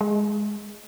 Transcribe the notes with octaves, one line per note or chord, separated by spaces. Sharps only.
G#3